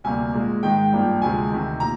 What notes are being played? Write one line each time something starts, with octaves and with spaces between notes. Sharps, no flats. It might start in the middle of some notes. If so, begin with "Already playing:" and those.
D2 C3 G3 A#3 G#5
A#2 G#3
G#2 D#3 G#3 G5
G2 F3 A#3
D2 C3 F3 G#3 G#5
D2 C3 D#3
A#2 A#5